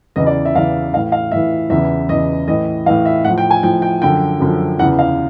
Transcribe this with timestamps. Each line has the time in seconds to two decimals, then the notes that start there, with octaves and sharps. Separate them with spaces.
0.16 E2 C#3 E3 D#5
0.26 D5
0.45 E5
0.55 E2 C#3 E3 F5
0.93 E3 F5
0.96 A2
1.12 F5
1.32 A2 E3 E5
1.70 E2 C#3 E3 E5
2.09 E2 C#3 E3 D#5
2.48 A2 E3 D#5
2.86 A2 E3 F5
3.05 E5
3.25 A2 F3 F#5
3.38 G5
3.51 G#5
3.63 A2 F3 G5
3.82 G5
4.02 F#2 D3 F3 G5
4.40 F#2 D3 F3
4.79 E2 C#3 E3 F#5
4.99 F5